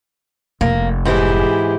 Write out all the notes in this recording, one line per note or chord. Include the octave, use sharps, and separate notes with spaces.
F1 A#3
G#2 E3 E4 G4 G#4